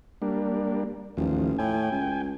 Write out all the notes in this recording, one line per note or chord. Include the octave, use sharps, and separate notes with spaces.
G3 A#3 D4
A1 D#2 F3
A2 G5 G#5
C#2